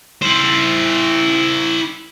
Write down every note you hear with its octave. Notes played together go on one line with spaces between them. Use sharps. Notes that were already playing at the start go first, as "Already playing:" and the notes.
E4 C5